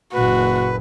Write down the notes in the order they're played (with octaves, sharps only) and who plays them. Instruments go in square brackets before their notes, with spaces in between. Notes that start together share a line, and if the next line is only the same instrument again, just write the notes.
[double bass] F#1 A#2 [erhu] F#4 [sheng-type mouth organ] B4